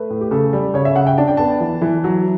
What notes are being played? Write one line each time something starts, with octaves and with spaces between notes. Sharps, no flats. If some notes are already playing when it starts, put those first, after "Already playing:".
Already playing: A3 B4
A2
G4
C#3 A4
G3
C#3 C#5
E5
C#3 F#5
G5
D4 A5
G5
B3 A5
E3
E3
F#3